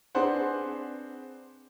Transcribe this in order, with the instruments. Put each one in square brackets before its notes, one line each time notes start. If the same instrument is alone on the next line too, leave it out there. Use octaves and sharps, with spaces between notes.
[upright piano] C4 D4 G#4 B4 C5 F#5